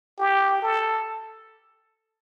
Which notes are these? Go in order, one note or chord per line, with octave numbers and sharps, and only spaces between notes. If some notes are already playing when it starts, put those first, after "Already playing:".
G4
A4